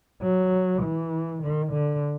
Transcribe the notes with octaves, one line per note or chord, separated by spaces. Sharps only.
F#3
E3
D#3
D3